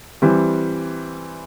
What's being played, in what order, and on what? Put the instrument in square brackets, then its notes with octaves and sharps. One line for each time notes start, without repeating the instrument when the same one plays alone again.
[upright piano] E3 G3 C4